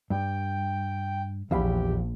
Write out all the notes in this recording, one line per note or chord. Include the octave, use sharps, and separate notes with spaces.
G2 G5
A#1 E2 G4 F5 B5